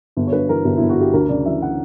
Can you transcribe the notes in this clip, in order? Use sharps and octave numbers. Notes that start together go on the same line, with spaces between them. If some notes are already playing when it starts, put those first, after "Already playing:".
G1
C#5
G2 B4
E3 A#4
G1 G4
G1 E4
F#4
G2 G4
D2 A#4
C#3 D5
E3 E5
F#5